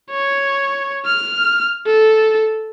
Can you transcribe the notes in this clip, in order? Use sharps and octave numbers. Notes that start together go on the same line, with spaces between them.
C#5
F6
A4